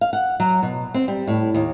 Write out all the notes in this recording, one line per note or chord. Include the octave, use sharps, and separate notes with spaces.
F5
F#5
F#3
B2
C4
G3
A2
D#2